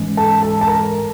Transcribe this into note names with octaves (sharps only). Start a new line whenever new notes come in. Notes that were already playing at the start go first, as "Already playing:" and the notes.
Already playing: G#2 E3 G#3 C#4
A4 A5
A4 A5
A5
A#4 A#5